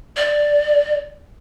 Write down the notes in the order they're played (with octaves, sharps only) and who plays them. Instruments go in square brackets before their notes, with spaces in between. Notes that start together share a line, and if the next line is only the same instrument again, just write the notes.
[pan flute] D5